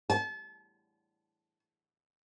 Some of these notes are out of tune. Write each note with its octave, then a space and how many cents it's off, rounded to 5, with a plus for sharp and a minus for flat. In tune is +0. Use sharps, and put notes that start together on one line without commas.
A5 -35